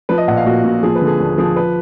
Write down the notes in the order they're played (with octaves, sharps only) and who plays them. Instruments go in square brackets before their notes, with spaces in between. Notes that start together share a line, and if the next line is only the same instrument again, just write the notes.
[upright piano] F3 B4
D#5
A#1 F#5
F5
A#2 F#4
A#2 F#4
F3 G#4
B4
D3
G#4
D#2
F3 G#4
B4